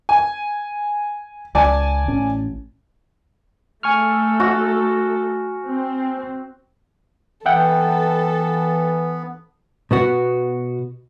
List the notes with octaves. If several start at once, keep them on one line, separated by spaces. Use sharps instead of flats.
G#5
C#2 D5 G#5 A5
A1 C#4
A3 A4 G#5 C#6 F6
F#4
C4
E3 B3 A4 E5 F#5 G5
B2 B3 F#4